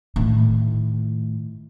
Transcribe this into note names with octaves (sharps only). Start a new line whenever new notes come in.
A2 D#3